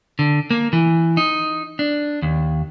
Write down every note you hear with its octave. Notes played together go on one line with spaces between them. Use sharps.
D3
A#3
E3
D#4
D4
D#2